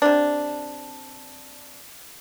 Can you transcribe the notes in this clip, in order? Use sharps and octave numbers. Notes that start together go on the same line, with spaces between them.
C3 D4